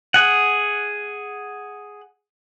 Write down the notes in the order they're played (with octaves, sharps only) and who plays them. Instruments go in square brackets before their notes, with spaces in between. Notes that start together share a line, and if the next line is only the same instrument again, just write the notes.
[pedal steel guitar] G#4 F#5